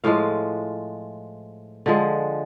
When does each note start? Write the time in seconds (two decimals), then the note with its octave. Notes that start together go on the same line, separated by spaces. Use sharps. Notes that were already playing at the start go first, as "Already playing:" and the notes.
0.04 A2 F3 G#3 F5
1.86 D3 F3 G#3